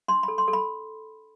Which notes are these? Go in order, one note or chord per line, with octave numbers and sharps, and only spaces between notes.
D4 C6
A4 B5
C6
A4
B5